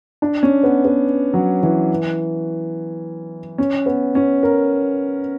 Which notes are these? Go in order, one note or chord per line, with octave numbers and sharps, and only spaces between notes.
D4
C#4
B3
B3
F#3
E3
C#4
B3
C#4
A#4